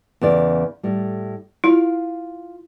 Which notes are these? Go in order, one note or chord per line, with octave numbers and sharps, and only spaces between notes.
E2 C#3 D5
A2 G3
E4 F4 F5